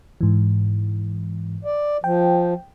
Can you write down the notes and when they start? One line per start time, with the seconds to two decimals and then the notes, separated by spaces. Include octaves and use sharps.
0.21 G#2 E3
1.65 D5
2.04 F3 G5